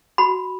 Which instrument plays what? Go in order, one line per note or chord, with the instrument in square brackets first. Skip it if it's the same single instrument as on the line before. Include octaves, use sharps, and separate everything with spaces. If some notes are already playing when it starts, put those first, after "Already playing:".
[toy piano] F#4 B5